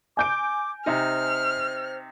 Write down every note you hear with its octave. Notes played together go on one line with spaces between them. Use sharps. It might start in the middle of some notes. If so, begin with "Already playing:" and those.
G#5 D6 G6 D7
C3 D#4 C5 F6